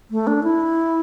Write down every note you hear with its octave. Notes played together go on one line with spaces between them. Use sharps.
A3
D4
E4